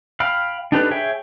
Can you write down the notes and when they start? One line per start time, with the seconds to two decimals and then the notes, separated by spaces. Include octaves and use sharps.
0.20 F5 G5 B5 F6
0.72 D4 D#4 G4 A4 B4
0.91 G#4 C#5 E5 G5